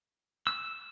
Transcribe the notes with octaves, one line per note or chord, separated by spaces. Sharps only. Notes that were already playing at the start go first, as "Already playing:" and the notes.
E6